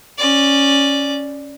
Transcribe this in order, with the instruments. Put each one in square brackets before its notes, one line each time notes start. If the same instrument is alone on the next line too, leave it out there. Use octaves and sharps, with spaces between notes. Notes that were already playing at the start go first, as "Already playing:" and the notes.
[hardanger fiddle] C#4 D5